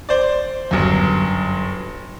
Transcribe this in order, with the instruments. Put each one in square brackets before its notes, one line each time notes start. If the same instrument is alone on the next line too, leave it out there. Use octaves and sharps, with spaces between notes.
[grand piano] C5 D5
G1 F#2